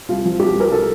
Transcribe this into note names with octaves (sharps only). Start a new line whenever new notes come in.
C2 F4
F3
C2 G4
C2 A#4
A4